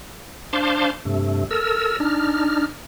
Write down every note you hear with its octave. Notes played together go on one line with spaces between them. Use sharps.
D4 C5 F5 A5 C6 D6
G2 C3 A3
A4 A#4 E6
D4 D#4 F6